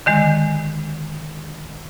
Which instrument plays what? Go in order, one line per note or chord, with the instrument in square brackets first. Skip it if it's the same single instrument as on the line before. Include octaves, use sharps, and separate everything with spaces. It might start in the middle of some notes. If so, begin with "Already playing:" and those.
[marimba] D3 D#3 G#3